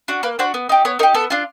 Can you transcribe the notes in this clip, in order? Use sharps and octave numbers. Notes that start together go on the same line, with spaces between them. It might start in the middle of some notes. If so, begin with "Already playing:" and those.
D4 F#4
A#3 B4
D4 F#4 C5
B3
D#4 G4
B3 C#5
D#4 G4 A#4
B3 A4
D4 F4